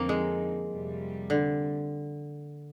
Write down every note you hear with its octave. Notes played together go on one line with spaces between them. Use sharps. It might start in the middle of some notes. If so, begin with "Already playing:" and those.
Already playing: F2 D3 F3 A#3 C4 D#4
G#3
F2 C3 G3
D3